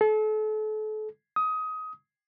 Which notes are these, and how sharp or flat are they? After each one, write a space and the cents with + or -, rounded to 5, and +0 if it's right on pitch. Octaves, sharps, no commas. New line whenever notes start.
A4 -35
D#6 +20